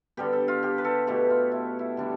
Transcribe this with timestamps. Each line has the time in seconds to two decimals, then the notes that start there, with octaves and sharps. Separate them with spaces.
0.17 D3 G3 B3 G4
0.33 A4
0.48 F4
0.63 G4
0.78 B4
0.85 A4
1.07 B2 A3 E4 G4
1.30 F4
1.52 E4
1.79 E4
1.97 D3 G3 D4